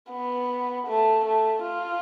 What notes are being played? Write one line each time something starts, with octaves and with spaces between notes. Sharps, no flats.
B3
A3
A3
F4